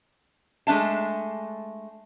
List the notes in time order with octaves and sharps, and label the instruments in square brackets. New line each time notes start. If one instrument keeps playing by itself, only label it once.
[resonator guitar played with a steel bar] G#3 A3 D4 E5 A5